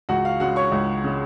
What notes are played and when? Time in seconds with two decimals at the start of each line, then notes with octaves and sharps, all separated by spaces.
0.09 C#2 F#4 F#5
0.25 F5
0.40 C#3 G#3 F#4 F#5
0.56 C#5 C#6
0.72 C#2
1.04 C#3 G#3